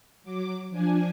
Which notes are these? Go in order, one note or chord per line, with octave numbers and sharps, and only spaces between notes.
F#3 D6
F3 D4 G#5